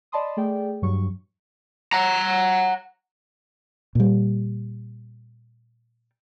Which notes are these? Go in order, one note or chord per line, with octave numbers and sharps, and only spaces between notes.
D5 D#5 A5 B5 C6 D#6
A3 G#4 D5 G5
G2 F#3 C#6
F#5 A#5
A#2 G3